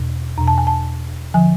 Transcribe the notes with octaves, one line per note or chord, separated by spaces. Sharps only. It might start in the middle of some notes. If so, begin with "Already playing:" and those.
Already playing: E2 B2
E2 B2 A#5
A5
G#5
A5
D3 F3 G#5